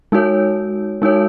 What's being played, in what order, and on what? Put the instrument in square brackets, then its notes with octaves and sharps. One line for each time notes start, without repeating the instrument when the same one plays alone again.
[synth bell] G#3 D#4 F#4 C#5
G#3 D#4 F#4 C#5